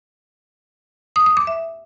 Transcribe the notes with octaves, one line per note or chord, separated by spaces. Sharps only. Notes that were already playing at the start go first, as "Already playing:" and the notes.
D#6
D#6
D6
E5